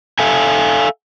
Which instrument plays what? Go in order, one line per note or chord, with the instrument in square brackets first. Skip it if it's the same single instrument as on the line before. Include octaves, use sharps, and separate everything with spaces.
[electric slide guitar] A4 E5 F5 G#5